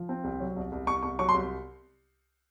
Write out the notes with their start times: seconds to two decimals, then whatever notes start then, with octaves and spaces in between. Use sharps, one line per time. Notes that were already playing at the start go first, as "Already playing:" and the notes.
Already playing: F3
0.09 C4
0.24 C2
0.40 F#3
0.56 C2
0.72 C2
0.87 C2 C#6
1.02 C2 C#6
1.19 F#3 C#6
1.29 C6
1.34 C2